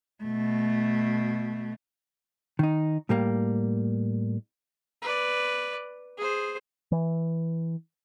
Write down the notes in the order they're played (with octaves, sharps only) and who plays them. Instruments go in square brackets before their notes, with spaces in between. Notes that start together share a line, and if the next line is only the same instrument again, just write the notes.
[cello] B2 A3
[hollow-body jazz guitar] D#3 D#4
A2 G3 A#3
[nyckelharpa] B4 D5
G#4 C5
[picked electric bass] E3